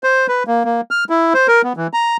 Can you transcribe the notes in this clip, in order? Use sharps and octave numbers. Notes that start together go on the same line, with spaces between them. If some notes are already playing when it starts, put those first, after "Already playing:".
C5
B4
A#3
A#3
F6
E4
C5
A#4
B3
E3
A#5